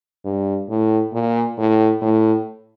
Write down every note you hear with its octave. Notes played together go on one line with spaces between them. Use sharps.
G2
A2
A#2
A2
A2